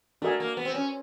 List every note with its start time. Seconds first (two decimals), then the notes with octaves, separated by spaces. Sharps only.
0.22 A3 D4 F#4 A#4 D#5 G#5
0.40 A#3
0.57 B3
0.65 C4
0.75 C#4